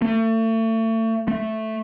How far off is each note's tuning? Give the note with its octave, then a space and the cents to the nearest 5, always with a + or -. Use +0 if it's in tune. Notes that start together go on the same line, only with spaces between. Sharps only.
A3 +35
A3 +0